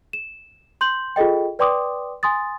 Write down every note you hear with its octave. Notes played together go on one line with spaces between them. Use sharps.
E7
C6 G6 F#7
F4 G#4 A4 D#5 G5
B4 D5 G5 C6 D6 D#6
G#5 C6 D#6 A6